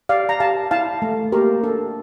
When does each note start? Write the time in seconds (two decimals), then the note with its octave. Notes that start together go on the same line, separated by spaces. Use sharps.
0.09 G4 D5 F5
0.29 A#5
0.40 G4 F5 A5
0.71 E4 F5 A5
1.02 A3
1.32 A#3 G4 A#4
1.63 D4 A4